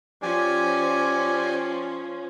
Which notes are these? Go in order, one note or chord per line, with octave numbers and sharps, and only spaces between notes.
F3 C#4 G4 D5 G#5